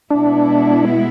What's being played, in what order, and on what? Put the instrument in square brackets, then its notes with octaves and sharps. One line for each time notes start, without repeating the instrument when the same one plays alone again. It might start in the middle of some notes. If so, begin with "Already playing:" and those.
[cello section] B2 G#3 B3 E4 [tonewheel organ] D4